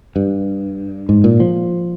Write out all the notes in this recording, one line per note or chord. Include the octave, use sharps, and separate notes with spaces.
G2
G#2
A#2
F3